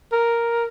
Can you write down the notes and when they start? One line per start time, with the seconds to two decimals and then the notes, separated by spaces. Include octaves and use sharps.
0.12 A#4